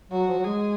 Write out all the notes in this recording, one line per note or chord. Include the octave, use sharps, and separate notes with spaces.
F#3 F#4
F3
F#3
G#3 G#4